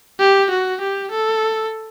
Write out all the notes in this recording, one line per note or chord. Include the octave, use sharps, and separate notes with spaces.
G4
F#4
G4
A4